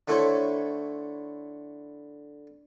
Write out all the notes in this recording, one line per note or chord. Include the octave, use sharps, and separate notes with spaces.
D3 A3 E4 A4 C5 C#5